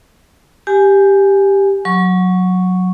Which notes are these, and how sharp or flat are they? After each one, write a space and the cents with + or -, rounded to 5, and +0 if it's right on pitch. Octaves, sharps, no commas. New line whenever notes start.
G4 +5 G#5 +0
F#3 -10 C#6 +0